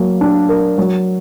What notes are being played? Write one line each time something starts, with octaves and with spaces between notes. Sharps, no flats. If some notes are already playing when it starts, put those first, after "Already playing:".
Already playing: F#3 A#3
D4
A#4
F#3